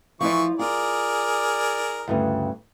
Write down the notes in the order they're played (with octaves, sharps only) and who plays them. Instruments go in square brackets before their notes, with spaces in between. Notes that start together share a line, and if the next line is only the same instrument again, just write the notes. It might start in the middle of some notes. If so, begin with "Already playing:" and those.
[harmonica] E3 C#6 [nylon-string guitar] F3 E4 D5
[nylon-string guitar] F4 [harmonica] G#4 A#4 D5
[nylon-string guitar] D2 G2 C#3